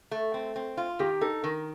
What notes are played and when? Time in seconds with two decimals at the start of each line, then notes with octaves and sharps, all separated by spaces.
0.11 A3
0.34 C4
0.56 C4
0.77 F4
0.99 D#3 G4
1.21 D#4 A4
1.43 D#3 A#4